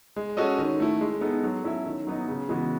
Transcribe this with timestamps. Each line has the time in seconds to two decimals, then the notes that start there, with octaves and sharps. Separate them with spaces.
0.16 G#3
0.37 C#4 F#4 A4 D#5
0.59 D#3
0.80 A3 E4
1.01 G#3
1.21 B3 D#4 A4
1.44 F#3
1.64 C#4 E4 A4 E5
1.86 D#3
2.07 F#3 B3 D#4
2.28 C#3
2.49 E3 G#3 B3 F#4